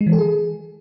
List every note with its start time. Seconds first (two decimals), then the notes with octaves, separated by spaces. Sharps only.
0.01 G#3
0.07 E3
0.13 A4
0.19 G#4